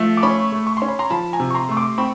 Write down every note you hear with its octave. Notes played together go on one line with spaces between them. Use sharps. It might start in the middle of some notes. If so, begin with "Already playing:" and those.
Already playing: F3 A3
D6
C#4 B5 C#6
A3
C#6
C#4 C6
B5
A#5 C6
F3 A5 B5
G#5 A#5
C3
C#6
A#5 C6
A3 C#6
C6 D6
C4 B5 C#6